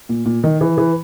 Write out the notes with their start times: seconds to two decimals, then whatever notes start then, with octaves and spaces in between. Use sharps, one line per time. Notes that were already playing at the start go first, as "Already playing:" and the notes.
0.09 A#2
0.26 A#2
0.44 D#3
0.61 E3
0.78 E3